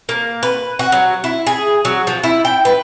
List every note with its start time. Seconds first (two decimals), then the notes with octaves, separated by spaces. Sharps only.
0.09 A#3
0.43 B4
0.79 F#4
0.92 F#3
1.24 E4
1.47 G#4
1.85 F#3
2.07 F3
2.23 E4
2.45 G5
2.65 B4